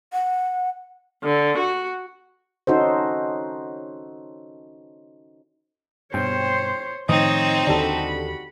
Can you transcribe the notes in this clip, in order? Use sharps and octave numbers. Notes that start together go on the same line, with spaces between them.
F#5
D3
F#4
C#4 D#4 F#4 A4 C5
G2 B2 C5 C#5 G5
A2 D#3 F3 C4 D#4 C#5 D#5
D#2 D3 D4 F#4 G4 A4 B5